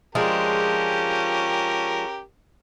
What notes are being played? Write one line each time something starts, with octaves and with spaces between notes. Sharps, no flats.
F3 G#3 C#4 D4 G4 A#4